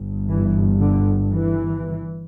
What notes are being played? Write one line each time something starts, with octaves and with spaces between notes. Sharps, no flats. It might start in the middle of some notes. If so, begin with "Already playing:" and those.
Already playing: G1 G2
E3
D3
E3